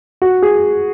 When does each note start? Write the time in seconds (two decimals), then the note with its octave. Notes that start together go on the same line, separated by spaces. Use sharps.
0.22 F#4
0.42 G#4